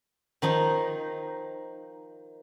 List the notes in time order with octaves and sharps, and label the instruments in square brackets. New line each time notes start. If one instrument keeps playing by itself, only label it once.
[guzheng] D#3 F3 D#4